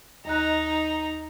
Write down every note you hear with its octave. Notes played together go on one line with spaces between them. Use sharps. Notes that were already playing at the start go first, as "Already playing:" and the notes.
D#2 D#4 D#5 A#5 F#6